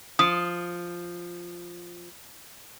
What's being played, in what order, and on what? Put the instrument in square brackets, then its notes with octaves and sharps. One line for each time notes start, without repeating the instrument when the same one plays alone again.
[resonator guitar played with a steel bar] F3 [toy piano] D#6